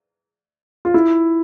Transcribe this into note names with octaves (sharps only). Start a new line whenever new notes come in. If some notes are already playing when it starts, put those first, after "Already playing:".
F4
E4